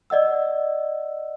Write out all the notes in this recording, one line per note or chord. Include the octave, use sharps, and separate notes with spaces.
D5 D#5 F#5 E6